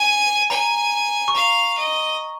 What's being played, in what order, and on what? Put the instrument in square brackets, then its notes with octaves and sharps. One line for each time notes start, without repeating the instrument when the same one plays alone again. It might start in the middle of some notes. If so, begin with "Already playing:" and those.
Already playing: [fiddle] G#5
[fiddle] G#5 [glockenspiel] A#5
[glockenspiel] C#6
[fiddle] F5 [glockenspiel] A#5
[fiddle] D#5